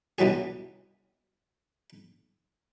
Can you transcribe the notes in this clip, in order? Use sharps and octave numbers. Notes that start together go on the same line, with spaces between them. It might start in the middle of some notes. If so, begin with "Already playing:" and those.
C2 B2 E3 F#3 G#4